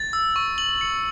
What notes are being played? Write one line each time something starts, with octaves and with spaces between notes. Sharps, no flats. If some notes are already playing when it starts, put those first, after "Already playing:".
Already playing: A6
E6
C#6
F#7
C#7